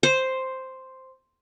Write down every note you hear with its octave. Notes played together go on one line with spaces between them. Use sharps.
C5